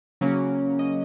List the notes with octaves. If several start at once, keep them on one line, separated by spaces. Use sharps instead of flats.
C#3 F#3 A#3 C#4
D#5